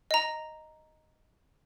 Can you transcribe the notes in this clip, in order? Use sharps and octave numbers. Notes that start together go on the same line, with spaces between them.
D#5 A#5